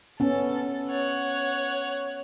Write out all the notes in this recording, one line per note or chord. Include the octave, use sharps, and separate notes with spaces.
B3 C#4 A4
C#5 F#5